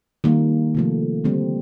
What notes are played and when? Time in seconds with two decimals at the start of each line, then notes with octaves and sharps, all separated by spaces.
0.24 D#3 G3 A#3
0.75 C3 F3 A3
1.24 D3 G3 A#3 C4